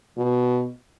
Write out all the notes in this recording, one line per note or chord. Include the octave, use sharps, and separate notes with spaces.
B2